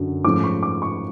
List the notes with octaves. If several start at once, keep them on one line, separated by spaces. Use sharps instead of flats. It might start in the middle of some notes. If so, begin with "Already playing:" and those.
Already playing: F#2 D3 F#3
G#2 F3 A3 C#4 D6
C#6
D6
C#6